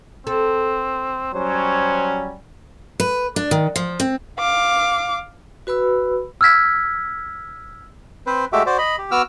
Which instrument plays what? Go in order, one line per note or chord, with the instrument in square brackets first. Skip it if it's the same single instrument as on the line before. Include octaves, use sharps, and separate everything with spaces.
[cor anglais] C4 [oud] A4
[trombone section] F#3 G3 C#4 [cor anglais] C5
[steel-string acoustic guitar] B4
D4
D#3
F3
C4
[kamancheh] F5 D6
[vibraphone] F#4 B4 B5 E6
[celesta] E6 F6 G#6 B6
[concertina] C4 B4 C5
G#3 A3 F#4 G4 E5 D6
F#4 C5 D5
D#5 B5
G4
B3 F#4 D6 E6 F6